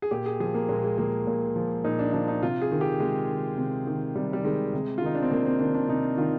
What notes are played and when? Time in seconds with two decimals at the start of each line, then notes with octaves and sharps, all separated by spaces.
0.02 G#4
0.11 A#2 G4
0.26 G#4
0.40 F3 G#4
0.54 A#3
0.69 A#2 G#3
0.84 G#3
0.98 F3 A#3
1.27 A#2
1.56 F3
1.84 A#2 D#4
1.99 D4
2.13 F3 D4
2.28 D#4
2.42 C3 F4
2.62 G#4
2.71 D#3
2.81 G4
3.00 C3 G#3
3.29 D#3
3.58 C3
3.87 D#3
4.15 C3 G3
4.33 G3
4.45 D#3 G#3
4.73 C3
4.98 F4
5.02 D#3 D#4
5.15 D4
5.23 C4
5.31 C3 A#3
5.45 C4
5.60 D#3 D4
5.74 D4
5.88 C3 D#4
6.17 D#3 F4